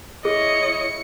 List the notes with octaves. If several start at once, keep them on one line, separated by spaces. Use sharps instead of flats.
E4 G#4 C#5 D#5 C#7